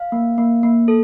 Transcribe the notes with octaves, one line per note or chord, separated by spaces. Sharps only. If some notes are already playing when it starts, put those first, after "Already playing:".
Already playing: F5
A#3
A#3
A#3
A4